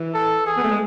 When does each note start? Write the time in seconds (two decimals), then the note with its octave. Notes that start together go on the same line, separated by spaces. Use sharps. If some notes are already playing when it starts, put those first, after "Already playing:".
Already playing: E3
0.14 A4
0.46 G#4
0.57 B3
0.64 A3
0.71 G#3